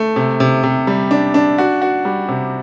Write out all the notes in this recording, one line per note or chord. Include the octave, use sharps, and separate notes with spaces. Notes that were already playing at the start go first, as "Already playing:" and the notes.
Already playing: A3
C3
C3
C3
G3
D4
D4
F#4
F#4
G3
C3